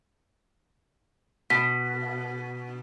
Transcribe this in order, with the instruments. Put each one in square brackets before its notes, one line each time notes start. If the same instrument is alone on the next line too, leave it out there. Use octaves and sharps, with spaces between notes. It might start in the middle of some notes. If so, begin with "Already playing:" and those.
[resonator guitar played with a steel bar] B2 [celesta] B6